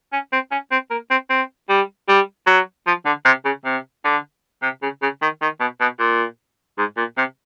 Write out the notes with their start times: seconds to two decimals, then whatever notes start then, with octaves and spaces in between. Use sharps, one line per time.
0.13 C#4
0.33 C4
0.51 C#4
0.71 C4
0.90 A#3
1.10 C4
1.30 C4
1.69 G3
2.08 G3
2.47 F#3
2.87 F3
3.06 D3
3.25 C3
3.45 C#3
3.65 C3
4.05 D3
4.62 C3
4.82 C#3
5.02 C#3
5.22 D#3
5.42 D#3
5.60 B2
5.81 B2
5.99 A#2
6.78 G#2
6.97 A#2
7.17 C3